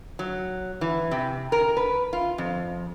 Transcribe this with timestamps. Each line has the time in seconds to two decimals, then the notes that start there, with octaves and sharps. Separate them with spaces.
0.19 F#3
0.81 E3
1.11 C3
1.52 A#4
1.77 B4
2.13 F4
2.38 F2